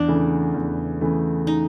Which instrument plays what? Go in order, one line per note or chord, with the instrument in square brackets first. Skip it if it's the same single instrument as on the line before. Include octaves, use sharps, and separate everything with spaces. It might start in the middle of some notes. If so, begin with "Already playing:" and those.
Already playing: [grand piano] E2 [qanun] D4
[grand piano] C#3 E3 A3
E2
C#3 E3 A3
[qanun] D#4